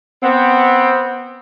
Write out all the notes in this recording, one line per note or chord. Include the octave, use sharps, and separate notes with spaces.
B3 C4